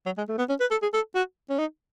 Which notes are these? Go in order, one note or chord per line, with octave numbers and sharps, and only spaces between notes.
F#3
G#3
A3
B3
C#4
B4
A4
G#4
A4
F#4
C#4
D#4